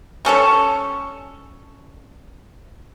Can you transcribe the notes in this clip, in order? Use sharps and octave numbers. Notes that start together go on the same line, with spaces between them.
G3 C#4 A4 C#5